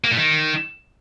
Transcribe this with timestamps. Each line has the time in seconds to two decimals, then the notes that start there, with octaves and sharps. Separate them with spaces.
0.04 A#3
0.11 A#2
0.18 D#3